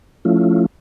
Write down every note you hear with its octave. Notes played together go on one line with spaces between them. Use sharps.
F3 A3 C#4 E4 F4